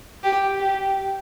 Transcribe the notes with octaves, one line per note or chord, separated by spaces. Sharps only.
G4
G4